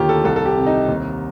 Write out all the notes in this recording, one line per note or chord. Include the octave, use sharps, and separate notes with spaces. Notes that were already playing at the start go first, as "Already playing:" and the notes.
Already playing: D#2 D3 D#3 F4 G4
A4
C2 A4
A4
G4
C3
D#4
D#2